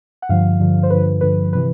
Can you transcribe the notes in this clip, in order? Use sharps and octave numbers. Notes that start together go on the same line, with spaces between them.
F#5
G2 D3 F3 F5
G2 D3 F3
C5
G2 D3 F3 B4
G2 D3 F3 B4
C3 E3 B4